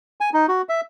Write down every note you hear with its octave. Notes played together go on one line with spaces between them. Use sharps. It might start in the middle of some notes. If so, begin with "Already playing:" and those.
G#5
D#4
F#4
E5